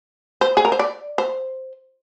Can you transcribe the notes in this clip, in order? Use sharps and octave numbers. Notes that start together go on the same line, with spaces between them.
C5
G#4
A#4
C5
D5
C5